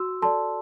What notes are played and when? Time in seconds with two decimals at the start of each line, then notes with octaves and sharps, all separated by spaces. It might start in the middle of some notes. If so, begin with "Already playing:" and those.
Already playing: F#4 C6 E6
0.22 A4 D5 A5 C6